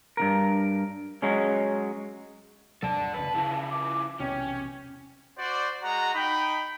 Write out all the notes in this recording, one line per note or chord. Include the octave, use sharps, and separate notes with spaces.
G2 C#3 A#4
F#3 G#3 C#4
D#2 C3 F#3 A4 D5 A5
G1
F#1 D2 C#3 B4
C#3 F3 E4
D6
E1 B1 C3 C#4 G5
F#4 C5 D5
G#3 F#4 F#5 A#5
D#4 G5 B5